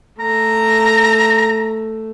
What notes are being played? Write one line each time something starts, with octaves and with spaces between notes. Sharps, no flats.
A3 A#5